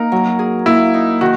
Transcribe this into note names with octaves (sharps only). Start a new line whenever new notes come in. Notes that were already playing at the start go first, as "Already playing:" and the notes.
Already playing: A#3 D#4 A#4
F#3
G#4
A#3 E4
D#4
D#3 F#4